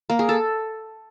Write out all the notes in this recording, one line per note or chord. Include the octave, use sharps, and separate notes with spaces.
A#3
G#4
A4